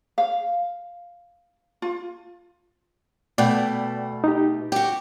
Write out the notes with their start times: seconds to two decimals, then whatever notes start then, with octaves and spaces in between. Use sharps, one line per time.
0.18 F5
1.82 F4
3.38 B2 A3 D5 F#5 G5
4.24 D#4 G4
4.72 F#4 G4 G5